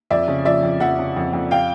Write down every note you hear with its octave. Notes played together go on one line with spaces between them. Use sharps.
F2 D5 E5
C#3
F3 D5 E5
F2
F2 E5 F#5
C#3
F2
F2
F5 G5